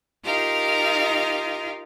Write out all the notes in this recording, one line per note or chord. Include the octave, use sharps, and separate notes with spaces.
D#4 F4 G4 A#4 F5